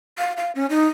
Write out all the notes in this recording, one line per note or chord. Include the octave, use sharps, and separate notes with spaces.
F5
F5
C#4
D#4